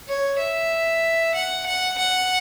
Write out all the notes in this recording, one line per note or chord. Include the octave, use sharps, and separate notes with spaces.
C#5
E5
F#5
F#5
F#5